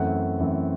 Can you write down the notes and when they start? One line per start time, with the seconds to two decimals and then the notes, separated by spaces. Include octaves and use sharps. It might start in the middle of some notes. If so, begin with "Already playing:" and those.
Already playing: F#2 E3 A3 C4 F#5
0.39 F#2 E3 A3 C4